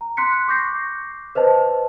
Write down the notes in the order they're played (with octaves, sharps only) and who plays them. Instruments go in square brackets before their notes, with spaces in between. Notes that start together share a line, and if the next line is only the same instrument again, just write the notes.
[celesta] A#5
C6 F#6 B6 C#7
C#6 D6 G6 A#6 C7
B4 C5 D#5 A5